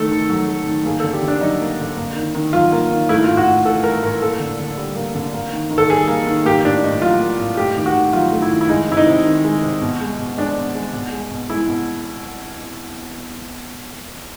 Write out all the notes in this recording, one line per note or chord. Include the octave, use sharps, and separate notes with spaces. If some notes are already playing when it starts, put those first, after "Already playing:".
Already playing: D#3 A3 A4
D#3
F#3
A3
D#3
A#3 G#4
A4
D3
G4
D3
D4
F#3 D#4
A#3
D3
A#3
D#3
D#3
F#3 F4
A#3
D#3
A3 E4
F4
A2
F#4
A2
E3 A4
A3 A#4
A2 A#4
A#3 A4
D3
D3
G3
A#3
D3
A#3
D#3
D#3
A4
G3 G#4
A#3
D#3
A#3 G4
A2 D4
A2 D#4
F#3 F4
A#3
A2
A3 G4
D#3 G4
F#4
D#3
F#3 F4
A3
E4
D#3
E4
G#3 D#4
C3 E4
D#4
C3
D#3
G#3
C3
B2
G#3
B2
G#3 D4
B2
G#3
B2
G#3
B2
G#3 E4
B2